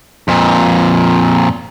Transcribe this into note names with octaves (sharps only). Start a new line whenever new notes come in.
F2 A#2